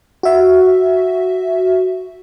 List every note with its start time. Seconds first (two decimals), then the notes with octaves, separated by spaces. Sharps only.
0.23 F#4 E5